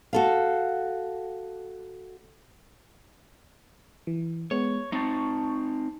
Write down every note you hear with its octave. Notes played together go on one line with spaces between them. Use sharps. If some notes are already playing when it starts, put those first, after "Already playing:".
F#4 A4 F5
E3
G#3 B3 C#5
C4 D#4 A5 C#6